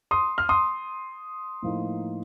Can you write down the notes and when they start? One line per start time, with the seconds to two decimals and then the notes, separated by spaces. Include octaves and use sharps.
0.11 C6 D#6
0.38 F6
0.49 C6 D#6
1.63 A2 F3 A#3 D#4